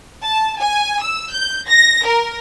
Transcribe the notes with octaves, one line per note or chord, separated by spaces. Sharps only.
A5
G#5
E6
G6
A#6
A#4